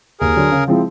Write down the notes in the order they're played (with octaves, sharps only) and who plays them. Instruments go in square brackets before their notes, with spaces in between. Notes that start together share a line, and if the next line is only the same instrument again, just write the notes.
[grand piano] D#2 [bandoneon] G#4 A#4
[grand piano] D3 F#3
C#3
F3 G#3 C4 E4